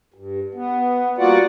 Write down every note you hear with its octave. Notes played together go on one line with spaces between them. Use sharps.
G2
B3
G3 A#3 F4 F#4 D5 F#5